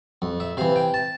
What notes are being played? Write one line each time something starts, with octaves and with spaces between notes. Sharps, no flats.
F2
E5
C3 E3 F5
G5
A5